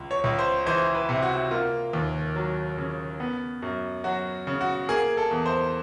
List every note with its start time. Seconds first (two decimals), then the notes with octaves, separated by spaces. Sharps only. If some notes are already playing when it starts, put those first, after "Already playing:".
Already playing: C#2
0.11 C#5
0.24 C#2
0.39 C5
0.66 E3 C5
0.95 B4
1.09 C3
1.22 F#4
1.51 A#3 F4
1.93 D#2
2.36 F#3
2.78 C#3
3.20 B3
3.62 F#2
4.04 F#3 F#4
4.47 C#3
4.61 F#4
4.89 A#3 G#4
5.17 A4
5.31 E2
5.46 C5